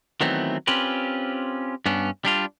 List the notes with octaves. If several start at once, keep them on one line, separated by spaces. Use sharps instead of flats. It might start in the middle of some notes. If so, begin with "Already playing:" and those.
D#3 E3 F#3 A3 B3 C4
C4 C#4 F4 G4 B4
G2 B3 C#4 D4
G3 D4 F4